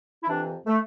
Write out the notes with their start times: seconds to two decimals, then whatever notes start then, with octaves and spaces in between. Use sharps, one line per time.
0.23 E4
0.28 F2 C3 E3 D4
0.67 A3